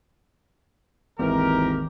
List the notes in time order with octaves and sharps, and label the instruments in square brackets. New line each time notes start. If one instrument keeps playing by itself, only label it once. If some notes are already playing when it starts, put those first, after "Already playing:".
[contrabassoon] G#1 [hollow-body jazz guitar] D#2 [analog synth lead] E3 [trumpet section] G4 A#4